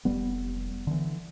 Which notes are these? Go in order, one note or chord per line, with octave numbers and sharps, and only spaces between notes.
F1 G3 B3
D3 E3